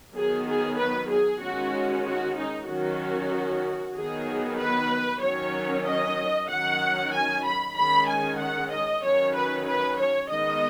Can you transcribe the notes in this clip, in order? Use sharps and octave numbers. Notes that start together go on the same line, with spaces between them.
D#3 F#3 B3 G#4
G#4
B4
G#4
D#3 G#3 C#4 F#4
F#4
D#4
D#3 F#3 C#4 F#4
D#3 F#3 B3 G#4
B4
D#3 F#3 C#4 C#5
D#5
D#3 F#3 C#4 F#5
G#5
B5
D#3 G#3 C#4 B5
G#5
F#5
D#5
D#3 F#3 C#4 C#5
B4
B4
C#5
D#3 G#3 B3 D#5